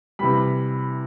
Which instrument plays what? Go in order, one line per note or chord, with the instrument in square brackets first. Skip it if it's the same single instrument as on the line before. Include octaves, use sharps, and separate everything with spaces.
[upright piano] C3 E3 G3 B5